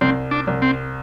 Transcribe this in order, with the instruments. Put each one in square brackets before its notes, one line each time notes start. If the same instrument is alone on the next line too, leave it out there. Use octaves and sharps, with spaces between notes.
[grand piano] C2 [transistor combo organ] C4
[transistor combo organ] D4
[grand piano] C2
[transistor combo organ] C4